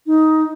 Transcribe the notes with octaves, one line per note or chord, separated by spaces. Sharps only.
D#4